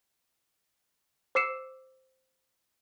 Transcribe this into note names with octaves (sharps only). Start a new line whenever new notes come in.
C5 D6 E6 C7 C#7 E7